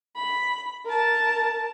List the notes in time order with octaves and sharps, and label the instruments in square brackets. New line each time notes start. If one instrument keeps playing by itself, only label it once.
[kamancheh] B5
A#4 A5